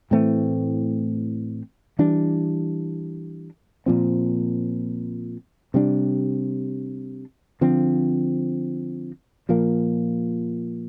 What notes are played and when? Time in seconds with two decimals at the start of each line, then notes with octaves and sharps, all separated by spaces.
0.11 A2 E3 A3 C4
1.99 E3 G3 D4
3.86 A#2 F3 C4
5.74 C3 G3 D4
7.61 D3 F3 C4
9.49 A#2 F3 A#3